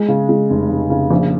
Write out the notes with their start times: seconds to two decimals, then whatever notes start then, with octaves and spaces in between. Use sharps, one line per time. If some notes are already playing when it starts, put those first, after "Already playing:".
Already playing: G#3
0.08 C#3
0.29 G#3
0.50 F1
0.70 F1
0.90 C#3
1.10 A#1